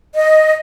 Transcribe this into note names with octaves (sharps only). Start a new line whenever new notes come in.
D#5